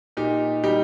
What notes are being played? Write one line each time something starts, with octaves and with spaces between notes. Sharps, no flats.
A#2 D#4 G4
G3 D#4 G4